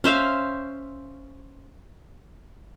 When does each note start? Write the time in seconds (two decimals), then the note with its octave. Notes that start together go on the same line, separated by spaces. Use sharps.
0.04 C#4 C5 E5 F5